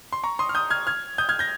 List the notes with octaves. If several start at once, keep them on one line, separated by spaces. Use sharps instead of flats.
C6
A#5 C#6
C6 D#6
F6
D#6 G6
F6 G#6
F6 G#6
D#6 G6
F6 G#6
G6 A#6